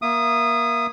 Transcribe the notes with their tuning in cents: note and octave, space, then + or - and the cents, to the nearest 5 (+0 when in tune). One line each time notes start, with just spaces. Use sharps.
A#3 +25 E5 +30 D#6 -10